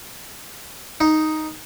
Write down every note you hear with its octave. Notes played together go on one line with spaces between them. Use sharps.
D#4